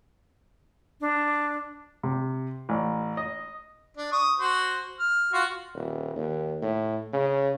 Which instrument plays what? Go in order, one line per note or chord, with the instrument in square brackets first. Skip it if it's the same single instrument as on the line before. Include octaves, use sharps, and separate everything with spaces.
[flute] D4
[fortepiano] C3
A1
D#5
[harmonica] D4
C#6 D#6
F#4 C5
F6
F4 F#4
[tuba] D#1
D#2
A2
C#3